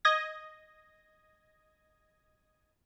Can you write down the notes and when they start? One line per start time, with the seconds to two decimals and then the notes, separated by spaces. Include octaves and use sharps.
0.05 D#5 D#6 G#6 A#6